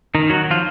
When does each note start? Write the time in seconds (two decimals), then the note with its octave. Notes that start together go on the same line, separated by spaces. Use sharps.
0.15 D#3 D#4
0.30 F#3 F#4
0.51 F3 F4